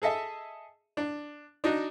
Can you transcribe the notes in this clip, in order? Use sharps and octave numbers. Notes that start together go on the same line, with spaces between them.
G#4 A4 D#5 E5
D4
D4 D#4 F#4